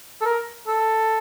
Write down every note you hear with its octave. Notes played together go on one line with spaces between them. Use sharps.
A4
A#4
A4